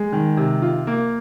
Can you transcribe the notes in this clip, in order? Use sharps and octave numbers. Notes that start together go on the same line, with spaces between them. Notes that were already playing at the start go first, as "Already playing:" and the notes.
Already playing: G#3
D#3
C3
F4
A#3